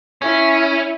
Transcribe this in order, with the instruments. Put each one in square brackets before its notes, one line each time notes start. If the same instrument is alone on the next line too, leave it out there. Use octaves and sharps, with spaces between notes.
[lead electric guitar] C#4 [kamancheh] E4